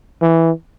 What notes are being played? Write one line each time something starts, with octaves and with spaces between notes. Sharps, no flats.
E3